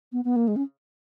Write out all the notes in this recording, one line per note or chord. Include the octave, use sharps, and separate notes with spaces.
B3
B3
A#3
G#3
C#4